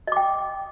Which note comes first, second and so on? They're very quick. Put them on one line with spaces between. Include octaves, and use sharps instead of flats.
D#5 D6 G5